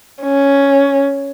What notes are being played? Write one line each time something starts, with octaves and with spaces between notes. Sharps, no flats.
C#4